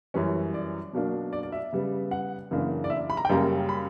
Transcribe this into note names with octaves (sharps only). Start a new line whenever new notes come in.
F#2 E3 G3 C#4
D5
B2 F#3 A#3 D4
D5
D5
E5
C#3 G3 B3
F#5
F#2 C#3 E3 A#3 D4
D5
E5
B5
A#5
G5
F#2 C#3 G3 A#3 C#4 A#5
B5